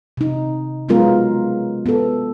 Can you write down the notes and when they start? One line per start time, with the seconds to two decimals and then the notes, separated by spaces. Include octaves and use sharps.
0.17 C3 D#4
0.89 F#3 G#3 B3 C#4 F4 A#4
1.86 B3 A4